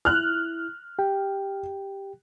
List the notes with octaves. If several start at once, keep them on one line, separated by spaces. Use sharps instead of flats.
E4 F6 F#6
G4 G5